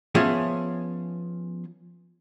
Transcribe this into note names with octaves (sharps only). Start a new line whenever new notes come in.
F3 B3 C#4 G#4 E5